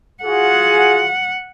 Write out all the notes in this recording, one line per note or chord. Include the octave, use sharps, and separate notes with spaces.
F4 F#4 G#4 F#5